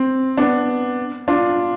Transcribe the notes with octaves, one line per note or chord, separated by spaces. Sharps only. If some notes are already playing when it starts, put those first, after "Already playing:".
Already playing: C4
B3 D4
D4 F4